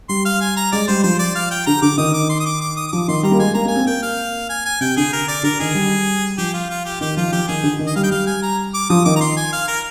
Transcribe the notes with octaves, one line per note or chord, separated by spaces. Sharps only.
G3 C6
F5
G#5
A#5
G#3 D5
G3 C5
F3 C5
D5
F5
G5
D3 A#5
D3 D6
D#3 D#6
D6
C6
D#6
D6
D6
D#6
D#6
F3 D6
D#3 C6
G3 A#5
A#3
G#3 G#5
A#3 A#5
A#3 G#5
C4
A#3 G5
F5
G#5
G#5
C3 G5
D3 G#4
A#4
D5
D3 A#4
D#3 G#4
G3
F3 G4
F4
F4
G4
D#3 G4
F3 F4
F3 G4
D#3 G#4
D3
D#3
D#5
G3 F5
G5
G3 F5
G#5
A#5
D6
F3 D#6
D#3 D6
A#5
C6
G#5
F5
A#4